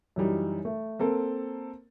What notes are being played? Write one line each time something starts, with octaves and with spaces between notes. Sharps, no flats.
F#2 E3 G3 D#4
A3
A#3 C4 A4